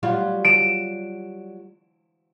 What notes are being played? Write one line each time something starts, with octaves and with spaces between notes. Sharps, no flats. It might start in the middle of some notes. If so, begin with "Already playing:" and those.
F#3 G3 F4
D7 E7